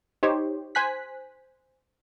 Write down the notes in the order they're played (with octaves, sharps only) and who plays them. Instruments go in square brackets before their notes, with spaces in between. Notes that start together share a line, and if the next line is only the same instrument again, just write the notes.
[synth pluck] D#4 G4 C5 C#5
C5 G#5 F#6 B6